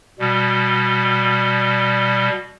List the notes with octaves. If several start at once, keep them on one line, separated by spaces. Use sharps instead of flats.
B2 G3